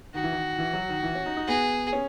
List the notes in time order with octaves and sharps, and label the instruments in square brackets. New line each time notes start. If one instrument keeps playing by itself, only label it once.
[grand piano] D#3 [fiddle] F#4
[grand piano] E3
D#3
E3
F#3
D#3
E3
C#4
D#4
D#4
[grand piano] B3 [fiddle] G#4
[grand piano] C#4